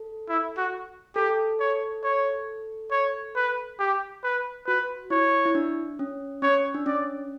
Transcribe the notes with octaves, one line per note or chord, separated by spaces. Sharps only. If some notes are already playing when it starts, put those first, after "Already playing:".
Already playing: A4
E4
F#4
G4 A4
C#5
C#5
C#5
B4
G4
B4
F#4 B4
E4 C#5
E4
D4
C#4
C#4 C#5
D4
C#4 D5